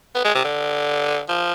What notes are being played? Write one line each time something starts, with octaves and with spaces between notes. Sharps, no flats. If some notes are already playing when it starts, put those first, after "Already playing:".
B3
G#3
C3
D3
F3